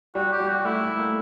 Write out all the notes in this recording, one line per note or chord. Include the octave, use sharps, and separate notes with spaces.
G3 F#4
G4
G3
F#4
A3 E4
A3
A#3